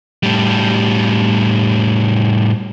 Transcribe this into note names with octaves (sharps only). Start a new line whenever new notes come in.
A2 G3